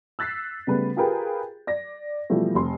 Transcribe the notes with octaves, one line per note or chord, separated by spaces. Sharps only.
E6 F#6 A6 B6 C7
C#3 G3 A3 B3 B4
F4 G4 G#4 A#4 B4 G5
D5 A#6
B2 E3 F3 G3 A3
F1 C6